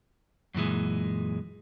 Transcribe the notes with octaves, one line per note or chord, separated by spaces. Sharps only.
F#2 A#2 E3 G#3